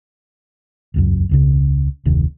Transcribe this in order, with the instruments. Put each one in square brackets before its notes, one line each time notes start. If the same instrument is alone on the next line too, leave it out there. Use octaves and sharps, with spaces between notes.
[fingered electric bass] E1 C#2 F#2
E1 C#2 C#3
F1 D2 C3 D#3